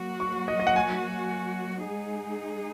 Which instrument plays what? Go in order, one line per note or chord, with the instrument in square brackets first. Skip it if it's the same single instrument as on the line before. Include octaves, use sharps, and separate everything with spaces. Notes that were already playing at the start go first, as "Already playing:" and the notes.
Already playing: [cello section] F#3 A#3 F#4
[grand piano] C#6
D#5
D#5
F#5
G#5
[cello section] G#3 D#4 G#4